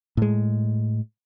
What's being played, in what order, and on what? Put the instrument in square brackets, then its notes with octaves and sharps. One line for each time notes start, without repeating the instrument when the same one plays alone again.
[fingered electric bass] A2 G#3